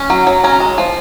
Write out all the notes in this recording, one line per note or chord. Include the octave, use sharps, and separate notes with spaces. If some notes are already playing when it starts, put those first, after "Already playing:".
Already playing: C#4
F#3
F#3
C#4 A#5
G#3
F3